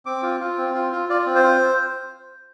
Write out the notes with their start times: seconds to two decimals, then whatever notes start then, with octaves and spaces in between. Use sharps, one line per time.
0.06 C4 D6
0.23 F4
0.40 F4
0.58 C4
0.74 F4
0.92 F4
1.09 F4 D5
1.26 C4
1.35 C5
1.44 F4